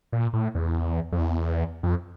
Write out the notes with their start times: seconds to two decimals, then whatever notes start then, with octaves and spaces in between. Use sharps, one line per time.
0.12 A#2
0.33 A2
0.55 E2
1.12 F2
1.19 E2
1.83 F2